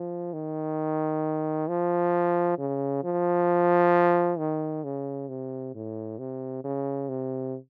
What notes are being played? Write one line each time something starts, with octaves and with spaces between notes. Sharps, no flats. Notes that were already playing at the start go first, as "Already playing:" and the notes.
Already playing: F3
D#3
F3
C#3
F3
D#3
C#3
C3
A2
C3
C#3
C3